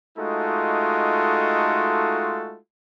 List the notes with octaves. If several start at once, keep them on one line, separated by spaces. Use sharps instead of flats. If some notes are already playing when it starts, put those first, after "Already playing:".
G#3 A3 D#4 F4 F#4 A4